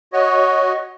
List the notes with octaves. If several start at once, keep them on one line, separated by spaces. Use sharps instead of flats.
F#4 C#5 D#5